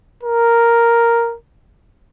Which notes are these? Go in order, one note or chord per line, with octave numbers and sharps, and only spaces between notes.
A#4